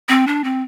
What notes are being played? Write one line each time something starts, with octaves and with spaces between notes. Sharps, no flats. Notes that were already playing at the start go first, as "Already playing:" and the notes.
C4
D4
C4